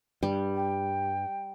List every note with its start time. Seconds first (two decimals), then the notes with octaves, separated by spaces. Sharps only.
0.23 G2 G3
0.55 G5